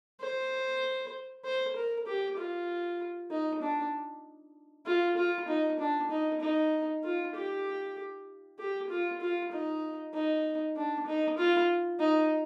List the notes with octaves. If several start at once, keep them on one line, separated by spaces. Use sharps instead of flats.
C5
C5
A#4
G4
F4
D#4
D4
F4
F4
D#4
D4
D#4
D#4
F4
G4
G4
F4
F4
D#4
D#4
D4
D#4
F4
D#4